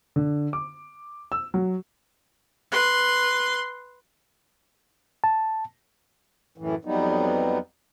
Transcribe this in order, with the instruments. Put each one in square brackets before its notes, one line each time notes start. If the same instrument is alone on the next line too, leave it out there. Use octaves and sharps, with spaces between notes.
[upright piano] D3
D6
E6
F#3
[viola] B4 C6
[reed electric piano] A5
[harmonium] F#2 A2 E3
F2 F#3 G3 B3 D#4